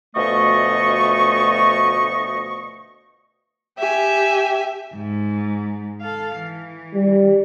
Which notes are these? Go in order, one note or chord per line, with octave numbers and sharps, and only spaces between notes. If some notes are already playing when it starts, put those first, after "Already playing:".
D2 B2 F3 A3 D#5 C#6
G4 E5 G#5
G#2
A4 F5
E3
G3